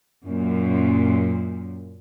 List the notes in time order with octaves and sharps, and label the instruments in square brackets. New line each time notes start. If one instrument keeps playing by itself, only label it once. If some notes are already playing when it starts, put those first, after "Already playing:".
[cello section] F#2 A#2